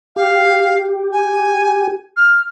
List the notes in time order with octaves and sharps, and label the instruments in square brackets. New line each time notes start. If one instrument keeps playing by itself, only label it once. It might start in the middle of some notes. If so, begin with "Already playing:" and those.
[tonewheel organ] G4 [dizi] F5
[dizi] G#5
F6